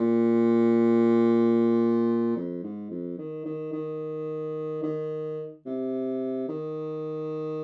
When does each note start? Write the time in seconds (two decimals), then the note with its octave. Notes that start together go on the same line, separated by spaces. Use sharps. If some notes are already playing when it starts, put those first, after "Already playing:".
Already playing: A#2
2.36 F2
2.63 G#2
2.91 F2
3.18 D#3
3.46 D#3
3.73 D#3
4.83 D#3
5.66 C3
6.48 D#3